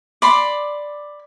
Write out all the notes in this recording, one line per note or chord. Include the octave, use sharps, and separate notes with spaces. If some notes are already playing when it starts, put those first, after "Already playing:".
D5 B5 C6